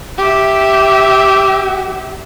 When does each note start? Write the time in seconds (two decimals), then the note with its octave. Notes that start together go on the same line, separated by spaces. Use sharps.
0.18 G4 E5